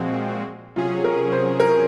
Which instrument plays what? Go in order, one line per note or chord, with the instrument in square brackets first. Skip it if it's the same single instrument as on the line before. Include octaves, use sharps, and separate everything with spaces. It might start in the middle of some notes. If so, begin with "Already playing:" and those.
Already playing: [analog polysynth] A#2 F3 G#3 C4 F#4
[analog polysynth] C3 F#3 C#4 G#4 [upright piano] F4
[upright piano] A#4
C5
A#4